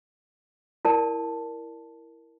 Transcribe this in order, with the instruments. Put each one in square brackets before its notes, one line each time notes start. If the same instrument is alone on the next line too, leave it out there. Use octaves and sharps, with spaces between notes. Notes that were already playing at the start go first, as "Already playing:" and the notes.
[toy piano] E4 A#4 D5 A5